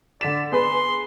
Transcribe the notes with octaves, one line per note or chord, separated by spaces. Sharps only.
D3 D5 B6 E7
B3 G#4 B4 C6